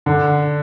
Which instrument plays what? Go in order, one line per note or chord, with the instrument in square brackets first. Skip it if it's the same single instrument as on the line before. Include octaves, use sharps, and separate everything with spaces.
[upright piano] D3